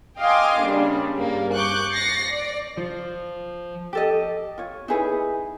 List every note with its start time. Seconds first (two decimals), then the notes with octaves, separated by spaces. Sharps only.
0.19 D#5 F5 G5 G#5 C6 D6
0.60 C#3 G3 A#3 D4
1.17 G2 G3 A#3
1.55 C#6 D6 F#6 G6
1.92 A6 A#6 C7 C#7
2.28 D5
2.77 F3
3.93 G4 A4 D#5
4.58 F4 C#5
4.88 D#4 E4 G#4 B4